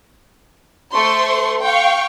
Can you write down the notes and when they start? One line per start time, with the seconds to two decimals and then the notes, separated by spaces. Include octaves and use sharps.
0.93 A3 C5 C6 C#6
1.61 F5 G5 C#6